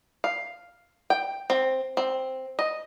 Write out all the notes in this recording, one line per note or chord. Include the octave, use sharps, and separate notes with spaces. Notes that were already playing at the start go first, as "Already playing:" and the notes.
F5
G5
C4
C4
D#5